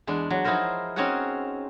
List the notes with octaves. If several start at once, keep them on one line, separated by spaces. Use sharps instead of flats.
E2 G#3 D4
F#3
F3 D#4 E4 G#4 A#4 C5
C4 C#4 D#4 F#4 G#4 F#5